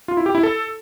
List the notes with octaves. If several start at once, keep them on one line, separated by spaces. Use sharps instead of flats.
F4
E4
G4
E4
A4